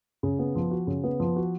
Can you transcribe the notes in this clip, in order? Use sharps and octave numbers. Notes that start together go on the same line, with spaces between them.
C#3
B3
F3
F#4
C#3
B3
F3
F#4